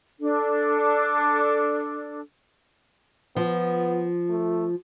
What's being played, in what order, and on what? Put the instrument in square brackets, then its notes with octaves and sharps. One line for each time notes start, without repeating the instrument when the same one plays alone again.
[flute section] D4 A4
[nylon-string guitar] F3 [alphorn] B3
[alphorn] A3